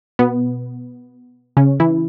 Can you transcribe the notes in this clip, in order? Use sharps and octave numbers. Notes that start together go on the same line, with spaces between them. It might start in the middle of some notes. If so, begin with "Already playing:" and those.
B2 B3
C#3 C#4
E3 E4